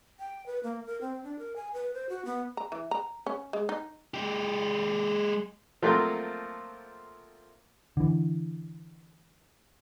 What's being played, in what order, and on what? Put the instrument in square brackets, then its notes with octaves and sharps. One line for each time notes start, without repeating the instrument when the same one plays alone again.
[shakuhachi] G5
B4
A#3
A#4
C4
D4
A#4
G#5
B4
C5
F#4
B3
[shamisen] A#5
E3
A#5
C#4
G#3
D#4
[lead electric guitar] G#3 G4
[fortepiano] F3 F#3 A3 A#3 C4 F4
[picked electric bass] D3 E3